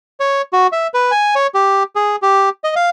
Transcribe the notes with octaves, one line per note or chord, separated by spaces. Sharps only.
C#5
F#4
E5
B4
G#5
C#5
G4
G#4
G4
D#5
F5